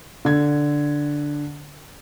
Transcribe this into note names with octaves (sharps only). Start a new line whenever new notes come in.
D3 G#6